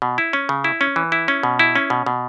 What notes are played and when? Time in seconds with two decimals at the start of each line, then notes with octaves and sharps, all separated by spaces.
0.02 B2
0.18 E4
0.33 C#4
0.49 C#3
0.64 E4
0.81 C#4
0.96 E3
1.12 E4
1.28 C#4
1.43 B2
1.59 E4
1.76 C#4
1.90 B2
2.06 B2